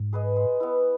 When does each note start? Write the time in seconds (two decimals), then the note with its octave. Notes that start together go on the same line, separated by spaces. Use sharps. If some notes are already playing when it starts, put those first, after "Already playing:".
Already playing: G#2
0.13 G#4 B4 D#5
0.36 G#3
0.60 B3 E4